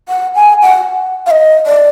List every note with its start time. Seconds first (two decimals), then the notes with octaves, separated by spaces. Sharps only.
0.09 F#5
0.35 G#5
0.62 F#5
1.26 F5
1.31 D#5
1.66 D5